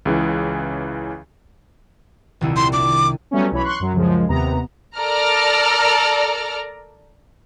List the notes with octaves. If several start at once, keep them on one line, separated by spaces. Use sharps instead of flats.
C#2 C#3 E3
D#1 C2 E4
C6
D4 D6
F#3 G3 A3 B3 C#4
B1 E3 C#5 B5
C6 C#6 F#6
F#2 F#3
C#2 F#2 F3 G#3
D#2 C3 B3 A#5
A4 A#4 D5 A#5 F6